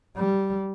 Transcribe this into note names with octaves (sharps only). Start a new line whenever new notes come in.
G3